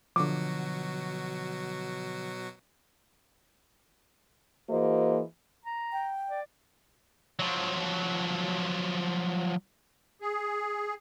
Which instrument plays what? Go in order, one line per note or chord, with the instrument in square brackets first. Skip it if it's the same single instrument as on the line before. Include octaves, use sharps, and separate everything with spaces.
[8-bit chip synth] B2 F#3 F#4 [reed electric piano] D3 F3 [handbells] D6
[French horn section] E3 A#3 F#4 G#4 C5 D#5
[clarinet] A#5
[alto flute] G5
[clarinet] D5
[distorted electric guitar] F3 F#3
[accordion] G#4